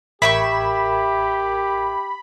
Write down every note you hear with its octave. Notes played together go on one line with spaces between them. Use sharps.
A1 G4 A#4 E5 G5 B5 C#6 G#6